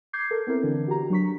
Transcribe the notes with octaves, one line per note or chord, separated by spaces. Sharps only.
D6 G6 G#6 C7
A4 A#4
B3 C4 E4 A#4
D3 E3 D4
F#4 G4 A#5
F#3 D4 C#6 B6